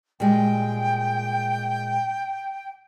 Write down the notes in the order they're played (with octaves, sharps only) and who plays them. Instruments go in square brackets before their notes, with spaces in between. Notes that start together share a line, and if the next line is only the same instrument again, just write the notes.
[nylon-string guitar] A#2 G3 G#3 [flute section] G5